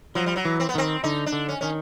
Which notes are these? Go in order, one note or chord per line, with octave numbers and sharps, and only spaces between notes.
F3 F#3
G3
F#3
E3
C4
B3
D#3 C4
D3 D#4
D4
D3
C#4
D#3 C#4